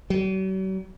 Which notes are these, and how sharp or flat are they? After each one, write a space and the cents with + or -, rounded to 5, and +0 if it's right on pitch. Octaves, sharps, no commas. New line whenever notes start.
F#3 +45